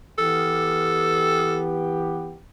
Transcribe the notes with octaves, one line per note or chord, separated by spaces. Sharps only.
E3 B3 G4 A4